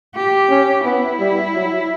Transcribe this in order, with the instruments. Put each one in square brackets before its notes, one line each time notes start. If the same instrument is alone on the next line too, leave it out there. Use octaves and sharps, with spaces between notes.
[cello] G4
[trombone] C#4
[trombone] B3 [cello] E4
[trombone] G3
F#3